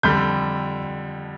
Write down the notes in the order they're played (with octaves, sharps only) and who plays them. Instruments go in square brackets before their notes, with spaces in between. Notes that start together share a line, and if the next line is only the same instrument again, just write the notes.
[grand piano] F2 D3 G3 G6